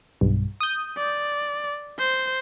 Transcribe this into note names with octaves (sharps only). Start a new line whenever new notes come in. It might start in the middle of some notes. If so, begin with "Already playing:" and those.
B1 G2
D#6 G6
D5
C5